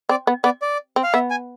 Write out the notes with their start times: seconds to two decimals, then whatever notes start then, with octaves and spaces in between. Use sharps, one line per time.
0.09 C4 D5
0.27 B3
0.44 B3 D5
0.62 D5
0.96 C4
1.03 F5
1.13 B3 E5
1.30 G#5